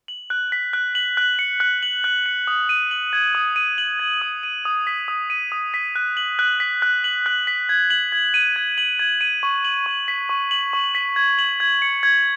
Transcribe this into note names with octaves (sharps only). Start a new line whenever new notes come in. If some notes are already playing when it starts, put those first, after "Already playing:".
F#7
F#6
B6
F#6
F#7
F#6
C#7
F#6
F#7
F#6
C#7
D#6
D#7
F#7
G#6
D#6
D#7
F#7
G#6
D#6
D#7
D#6
B6
D#6
D#7
D#6
B6
F#6
F#7
F#6
B6
F#6
F#7
F#6
B6
G#6
F#7
G#6
D#7
G#6
F#7
G#6
D#7
C#6
F#7
C#6
B6
C#6
F#7
C#6
B6
G#6
F#7
G#6
C#7
G#6